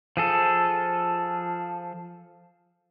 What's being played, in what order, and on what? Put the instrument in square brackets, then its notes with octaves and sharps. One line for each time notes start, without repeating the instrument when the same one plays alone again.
[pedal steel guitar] F3 G#4 A4